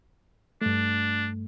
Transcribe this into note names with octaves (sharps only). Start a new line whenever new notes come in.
G2 A3 D4